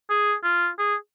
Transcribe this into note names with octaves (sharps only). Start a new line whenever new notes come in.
G#4
F4
G#4